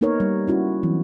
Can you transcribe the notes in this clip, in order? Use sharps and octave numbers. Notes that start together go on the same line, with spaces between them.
A#3 B3 D#4 A#4 B4 C#5
G3
C#4 E4 F#4
E3 F#3 C4